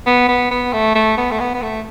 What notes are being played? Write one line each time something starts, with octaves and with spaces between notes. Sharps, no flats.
B3
B3
B3
A3
A3
B3
A3
B3
B3
A3